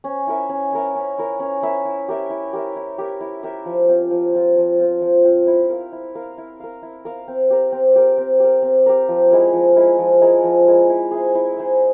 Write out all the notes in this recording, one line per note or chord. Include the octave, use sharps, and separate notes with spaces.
C#4
E4 A#4 E5
C#4
E4 A#4 E5
C#4
E4 A#4 E5
C#4
E4 A#4 E5
E4
G4 A#4 E5
E4
G4 A#4 E5
E4
G4 A#4 E5
E4
G4 A#4 E5
F3
C4 F4
F3
C4 F4
F3
C4 F4
F3
C4 F4
E4
A#4 F5
E4
A#4 F5
E4
A#4 F5
E4
A#4 F5
C4
G4 A#4
C4
G4 A#4
C4
G4 A#4
C4
G4 A#4
F3
G#3 E4 A#4
F3
G#3 E4 A#4
F3
G#3 E4 A#4
F3
G#3 E4 A#4
E4
G#4 C5 E5
E4
G#4 C5 E5